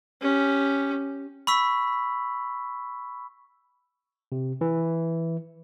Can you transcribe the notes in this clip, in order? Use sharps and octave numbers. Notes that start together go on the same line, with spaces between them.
C#4 G4
B5 C#6 E6 B6
C3
E3